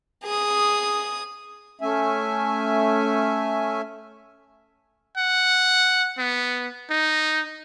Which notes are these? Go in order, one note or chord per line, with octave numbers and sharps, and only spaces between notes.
G#4 D#6
A3 C#4 E5 G#5
F#5
B3
D#4